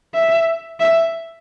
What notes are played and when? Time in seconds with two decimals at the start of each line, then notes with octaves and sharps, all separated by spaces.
0.14 E5
0.80 E5